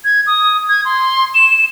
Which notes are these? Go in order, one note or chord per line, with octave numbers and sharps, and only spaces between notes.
G#6
D#6
G#6
C6
E7